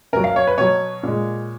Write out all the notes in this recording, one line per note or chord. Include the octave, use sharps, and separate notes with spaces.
B2 F#3 A#4
F5
C#5
B4
B2 F#3 C#5
A#2 G#3